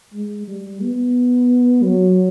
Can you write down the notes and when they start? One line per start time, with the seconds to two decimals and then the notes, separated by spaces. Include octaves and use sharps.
0.14 G#3
0.48 G3
0.82 B3
1.83 F#3